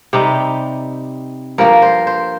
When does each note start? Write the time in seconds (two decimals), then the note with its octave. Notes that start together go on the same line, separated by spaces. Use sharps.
0.13 C3 G3 D#4 G4
1.58 G2 F3 A#3 A#4
1.82 C5
2.07 C5